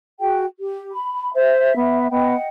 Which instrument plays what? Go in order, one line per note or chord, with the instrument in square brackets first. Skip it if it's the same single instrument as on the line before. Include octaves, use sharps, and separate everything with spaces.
[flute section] F#4 G#4 G5
G4
B5
[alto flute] C5 [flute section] E5
[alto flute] B3
[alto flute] B3 [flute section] D#5 F#5 G5